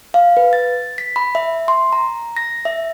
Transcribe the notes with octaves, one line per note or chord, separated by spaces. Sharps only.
F5
B4
A6
B6
B5
E5
C6
A#5
A#6
E5